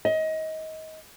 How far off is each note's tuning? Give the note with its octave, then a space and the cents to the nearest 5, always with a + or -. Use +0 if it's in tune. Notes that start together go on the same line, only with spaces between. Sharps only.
D#5 +25